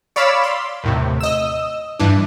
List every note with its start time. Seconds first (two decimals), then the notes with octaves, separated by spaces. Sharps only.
0.16 C#5 D5 F5 B5 D6 E6
0.44 C6
0.84 D#2 A2 C3
1.20 D#5 E6
1.99 G2 E3 D4